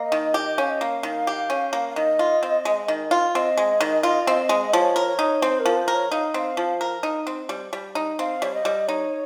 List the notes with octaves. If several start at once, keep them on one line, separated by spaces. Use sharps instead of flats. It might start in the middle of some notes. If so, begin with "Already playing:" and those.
Already playing: A#3 D#5
D#3
G4
C#4 F5
D#5
A#3 F5
D#3
G4
C#4
A#3
F5
D#3 D#5
F4
C4
G#3
D#3
F4
C4 D#5
G#3
D#3
F4
C4
G#3
F3 C#5
A#4
C#5
D#4
C4 C5
A#4
F3
C5
A#4
C#5
D#4 F5
C4 F5
F3
A#4
D#4
C4
G3
G3
D#4
C4 F5
G3 C#5
D#5
G3
D#4 C#5